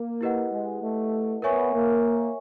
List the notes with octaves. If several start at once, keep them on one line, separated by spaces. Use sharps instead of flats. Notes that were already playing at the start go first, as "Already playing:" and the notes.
Already playing: A#3
E4 G4 B4 D#5 F#5
G#3
A3
B3 A#4 C#5 E5 G#5 C#6
A#3